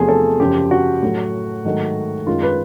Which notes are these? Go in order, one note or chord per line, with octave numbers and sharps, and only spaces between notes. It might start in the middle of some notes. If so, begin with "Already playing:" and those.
Already playing: E2 C3 F3 A3 G#4
A4
F#2 C#3 F3 G4
F#4
A2 F#3 A3
G#2 D#3 F#3 A3
F#2 D#3 G#3 F4
B4